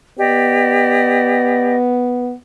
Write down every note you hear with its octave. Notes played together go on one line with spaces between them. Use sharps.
B3 G4 D5 D#5